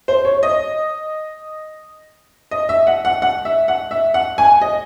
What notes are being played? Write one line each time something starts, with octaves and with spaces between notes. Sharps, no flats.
C5
C#5
D#5
D#5
E5
F#5
F#5
F#5
E5
F#5
E5
F#5
G#5
D#5